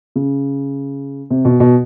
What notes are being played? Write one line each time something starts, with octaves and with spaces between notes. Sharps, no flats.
C#3
C3
B2
B2